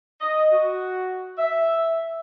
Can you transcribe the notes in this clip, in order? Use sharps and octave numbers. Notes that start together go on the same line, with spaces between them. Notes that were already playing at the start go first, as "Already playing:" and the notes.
D#5
F#4
E5